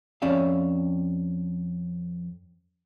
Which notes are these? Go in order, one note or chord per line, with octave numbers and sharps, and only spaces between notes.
F2 C#4 D5 E5 F5